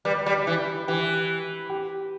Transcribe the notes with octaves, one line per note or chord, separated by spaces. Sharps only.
G3 B4
G3 G4
E3 E4
E3 G4
G4